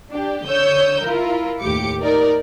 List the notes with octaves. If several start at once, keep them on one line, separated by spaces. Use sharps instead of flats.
D4 G4
D3 C#5 D#6 E6 G6
E4 F4 A#4
D#2 A2 G4 D6 C#7
D#4 A#4 D5